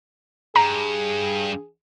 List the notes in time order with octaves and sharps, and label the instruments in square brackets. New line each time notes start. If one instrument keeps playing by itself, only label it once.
[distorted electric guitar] G2 [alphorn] G#4 [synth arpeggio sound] A#5